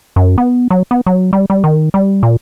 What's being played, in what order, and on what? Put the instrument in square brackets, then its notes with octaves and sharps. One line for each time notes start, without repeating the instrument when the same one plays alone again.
[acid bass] F#2
B3
F#3
B3
F#3
G3
G3
D#3
G3
A#2